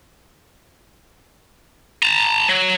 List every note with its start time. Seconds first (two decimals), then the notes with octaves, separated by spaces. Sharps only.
2.03 A5 A#5
2.49 F#3